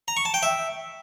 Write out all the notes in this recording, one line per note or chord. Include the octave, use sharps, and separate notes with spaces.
A#5
C#6
A5
G5
E5